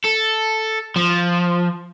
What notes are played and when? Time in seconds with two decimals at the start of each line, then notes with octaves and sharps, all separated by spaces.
0.04 A4
0.96 F3